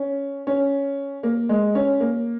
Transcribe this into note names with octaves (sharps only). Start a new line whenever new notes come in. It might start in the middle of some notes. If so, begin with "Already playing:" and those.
Already playing: C#4
C#4
A#3
G#3
C#4
A#3